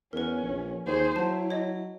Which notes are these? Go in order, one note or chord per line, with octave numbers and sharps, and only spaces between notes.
E2 C#4 A#4 B4
A#1
D#2 G#4 C5
F#3 E4 A5
C#5 D#5